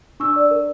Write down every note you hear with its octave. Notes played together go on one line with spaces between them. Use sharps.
D4 C#6 E6
D5
A#4